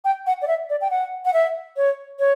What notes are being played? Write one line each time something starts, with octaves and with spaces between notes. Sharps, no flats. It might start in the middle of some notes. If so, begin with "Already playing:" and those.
G5
F#5
D5
E5
D5
G5
F#5
F#5
E5
C#5
C#5